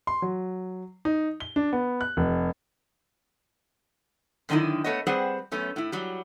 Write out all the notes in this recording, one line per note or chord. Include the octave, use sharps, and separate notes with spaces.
C6
F#3
D#4
G7
D4
B3
F#6
F1
F#2 D3 D#3 C#4 D#4 E4
A3 B3 C#5 D#5
G3 C4 G#4 B4 C5 F#5
F#2 A3 B3 C#4
A2 E4
F#3 G3